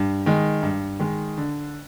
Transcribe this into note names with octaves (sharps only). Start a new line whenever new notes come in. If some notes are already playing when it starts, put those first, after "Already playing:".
Already playing: G2
D#3 G#3
G2
D#3 G#3
D3